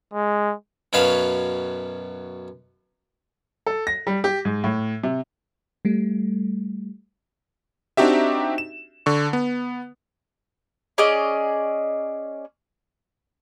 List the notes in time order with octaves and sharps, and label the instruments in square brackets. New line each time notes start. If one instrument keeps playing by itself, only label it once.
[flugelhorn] G#3
[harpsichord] F#2 B2 C#4 B4 F5 A5
[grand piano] A4
A#6
G3
G4
G#2
A2
C3
[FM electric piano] G3 A3
[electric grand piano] C4 D4 D#4 F#4 G4 E5
E7
D3 C#6
B3
[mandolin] C#4 G#4 D5 D#5